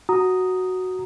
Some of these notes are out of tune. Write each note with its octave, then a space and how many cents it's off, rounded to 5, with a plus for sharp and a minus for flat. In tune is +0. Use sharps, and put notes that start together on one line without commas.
F#4 +0 A#5 +0 D#6 +0